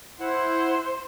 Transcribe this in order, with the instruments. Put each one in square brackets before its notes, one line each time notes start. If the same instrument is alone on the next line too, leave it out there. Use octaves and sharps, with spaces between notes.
[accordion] E4 F#5 [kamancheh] C5